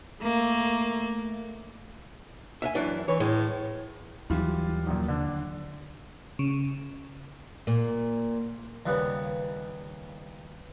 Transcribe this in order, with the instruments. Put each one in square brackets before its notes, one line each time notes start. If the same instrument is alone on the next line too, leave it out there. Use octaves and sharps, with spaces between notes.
[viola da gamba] A3 A#3
[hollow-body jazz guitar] E5 F5 G#5
F#2 E3 D4
[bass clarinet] E3 [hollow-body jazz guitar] C#5
[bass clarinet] A2 [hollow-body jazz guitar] G#3
[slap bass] D#2 F#3 G3 [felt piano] E3 F4 G4
[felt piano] A#1 F#2 A#2
D3 D4
[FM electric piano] C#3
[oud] A#2
[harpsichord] D#2 C#3 G3 B3 B4